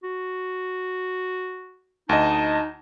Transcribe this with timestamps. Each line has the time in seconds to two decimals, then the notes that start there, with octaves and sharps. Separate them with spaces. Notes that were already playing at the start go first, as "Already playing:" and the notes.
0.03 F#4
2.09 D2 D#4 D#5 A5